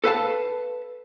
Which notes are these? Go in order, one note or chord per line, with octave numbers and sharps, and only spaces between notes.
A4 B4 F5 A5